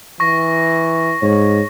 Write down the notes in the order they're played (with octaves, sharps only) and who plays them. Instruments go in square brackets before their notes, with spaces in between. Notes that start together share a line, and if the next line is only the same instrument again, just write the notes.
[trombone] E3 [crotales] C#6 A#6
[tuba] G#2 [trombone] C#5